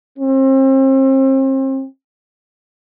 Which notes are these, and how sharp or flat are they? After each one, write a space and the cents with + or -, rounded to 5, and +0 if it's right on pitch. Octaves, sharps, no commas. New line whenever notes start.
C4 +35